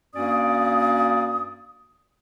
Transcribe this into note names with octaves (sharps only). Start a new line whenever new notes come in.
G2 A#3 C#4 F#4 D5 D#6